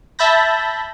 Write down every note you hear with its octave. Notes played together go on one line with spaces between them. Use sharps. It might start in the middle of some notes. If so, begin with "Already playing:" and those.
E5 A5 B5 G6 A#6